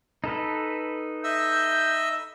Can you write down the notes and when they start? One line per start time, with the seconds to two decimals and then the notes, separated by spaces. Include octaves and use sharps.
0.24 D#4 A4 B4
1.24 D#5 E5 E6 G6